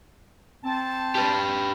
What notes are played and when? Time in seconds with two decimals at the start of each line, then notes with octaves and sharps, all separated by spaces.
0.64 C4 A5
1.15 G4 B4